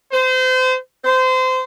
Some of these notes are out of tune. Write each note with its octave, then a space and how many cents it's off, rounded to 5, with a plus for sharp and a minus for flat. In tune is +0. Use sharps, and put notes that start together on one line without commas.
C5 -30
C5 -25